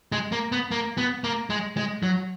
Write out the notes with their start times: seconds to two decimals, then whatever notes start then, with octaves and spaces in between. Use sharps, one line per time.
0.12 G#3
0.32 A#3
0.52 B3
0.71 A#3
0.98 B3
1.24 A#3
1.50 G#3
1.77 G#3
2.03 F#3